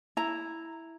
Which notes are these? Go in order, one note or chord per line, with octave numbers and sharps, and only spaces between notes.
E4 A#5